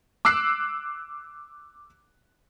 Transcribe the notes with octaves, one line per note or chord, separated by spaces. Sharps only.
D6 E6 F#6 C7